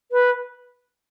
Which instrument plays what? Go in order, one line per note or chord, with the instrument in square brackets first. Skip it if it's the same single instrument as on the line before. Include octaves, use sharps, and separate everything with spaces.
[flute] B4